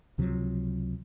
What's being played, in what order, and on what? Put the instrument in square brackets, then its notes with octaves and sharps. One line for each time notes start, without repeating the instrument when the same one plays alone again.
[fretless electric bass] C#2 C3 F3 F#3